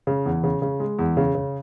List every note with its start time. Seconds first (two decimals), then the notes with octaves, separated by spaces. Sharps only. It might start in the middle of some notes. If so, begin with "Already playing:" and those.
0.07 C#3
0.26 E2
0.44 C#3
0.62 C#3
0.80 G#3
0.99 E2
1.17 C#3
1.35 C#3